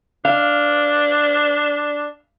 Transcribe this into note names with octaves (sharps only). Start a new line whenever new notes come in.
D4 F5